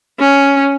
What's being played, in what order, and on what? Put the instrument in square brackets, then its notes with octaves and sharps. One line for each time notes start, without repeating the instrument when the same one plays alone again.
[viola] C#4